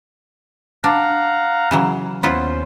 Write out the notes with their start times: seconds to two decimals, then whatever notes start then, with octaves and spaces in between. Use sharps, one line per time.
0.84 D4 F5 F#5 A#5
1.71 C#3 E3 F#3
2.23 D#2 B3 C#4 E4 F4 C5